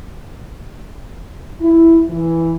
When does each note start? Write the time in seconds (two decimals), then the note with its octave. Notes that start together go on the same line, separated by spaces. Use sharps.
1.61 E4
2.09 E3